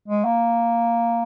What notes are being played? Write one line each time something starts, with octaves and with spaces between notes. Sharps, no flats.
G#3
A#3